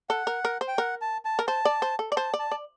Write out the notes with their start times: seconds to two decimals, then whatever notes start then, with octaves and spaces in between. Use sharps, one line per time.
0.09 A4 F#5
0.27 A#4
0.45 A#4
0.61 C5
0.68 G5
0.78 A#4 F#5
1.01 A5
1.25 A5
1.39 A#4
1.47 C5 A5
1.65 D5
1.82 C5
1.99 A4
2.12 D5
2.16 C5 A5
2.34 D5
2.39 A5
2.51 D5